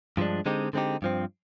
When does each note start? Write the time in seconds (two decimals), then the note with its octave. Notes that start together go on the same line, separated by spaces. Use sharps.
0.17 G2 F3 G#3 D4
0.46 D3 G#3 C4 D#4 G4
0.73 D3 G#3 C4 D#4 G4
1.02 G2 F3 C4